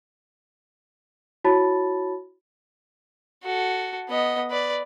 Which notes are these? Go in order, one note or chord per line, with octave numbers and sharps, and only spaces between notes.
E4 F#4 C#5 A5 B5 A6
F#4 A4
B3 D#5
B4 D5